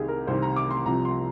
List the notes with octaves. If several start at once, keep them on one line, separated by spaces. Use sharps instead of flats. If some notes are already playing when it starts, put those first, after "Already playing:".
Already playing: C2 C3 D#3 G4 G#4
A#4
C2 C3 D#3 C5
A#5
D6
C6
C2 C3 F3 A#5
C6